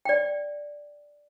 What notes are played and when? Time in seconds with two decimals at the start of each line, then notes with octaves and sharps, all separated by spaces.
0.05 D5 G5